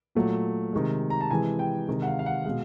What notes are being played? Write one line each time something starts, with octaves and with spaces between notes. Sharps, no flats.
A#2 F#3 A3
C3 D#3 G#3
A#5
A5
C3 E3 G#3 G#5
G5
C3 D#3 G#3
F#5
F5
F5
F#5
B2 G#3 F5